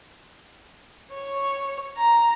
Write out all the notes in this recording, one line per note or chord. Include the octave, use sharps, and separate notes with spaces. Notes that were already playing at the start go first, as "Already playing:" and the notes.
C#5
A#5